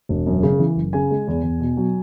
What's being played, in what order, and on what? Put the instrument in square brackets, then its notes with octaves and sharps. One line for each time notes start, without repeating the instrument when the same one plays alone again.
[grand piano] E1
F#2
C#3
E3
F#1
C#3 G#5
G#3
E2
E2
B2
F#3